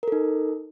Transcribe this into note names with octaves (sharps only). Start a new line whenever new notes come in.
D#4 A4 A#4